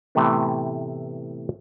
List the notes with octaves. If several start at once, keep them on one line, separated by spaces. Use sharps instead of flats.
A2 C3 E3 A3 B3